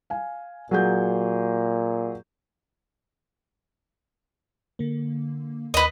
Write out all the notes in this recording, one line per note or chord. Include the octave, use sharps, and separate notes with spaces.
F5 G#5
A#2 F#3 G#4 G6
D3 A#3
D#2 B4 D#5